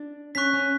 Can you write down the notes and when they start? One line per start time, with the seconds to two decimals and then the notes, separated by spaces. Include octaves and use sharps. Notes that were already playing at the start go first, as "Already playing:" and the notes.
Already playing: D4
0.35 C#4 C#6 F#6 B6
0.53 C#4